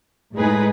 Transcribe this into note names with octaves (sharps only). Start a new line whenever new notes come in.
A2 G#3 D#4 G#4 B4